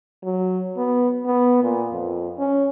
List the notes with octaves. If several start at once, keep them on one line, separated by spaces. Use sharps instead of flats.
F#3
B3
B3
A#2
F2
C#4